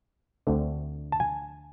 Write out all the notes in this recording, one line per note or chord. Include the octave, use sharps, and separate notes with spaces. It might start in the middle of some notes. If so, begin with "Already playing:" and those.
D2 D3 A3 C4
A5
G#5